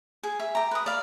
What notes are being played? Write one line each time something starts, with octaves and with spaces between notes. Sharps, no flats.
G#4
E5
G4 A#5
B4 D#6
D5 F5 B5